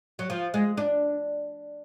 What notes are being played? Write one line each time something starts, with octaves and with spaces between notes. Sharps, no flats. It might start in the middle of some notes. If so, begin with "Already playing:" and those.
F#3
F3
G#3
D4